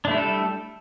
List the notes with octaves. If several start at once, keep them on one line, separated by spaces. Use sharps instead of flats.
G3 A3 D4 E4 A4